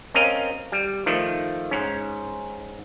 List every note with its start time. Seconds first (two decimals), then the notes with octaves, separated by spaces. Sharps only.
0.14 C4 C#4 A#4 D#5 F5
0.72 G3
1.06 D#3 F3 A3
1.71 G#2 C#4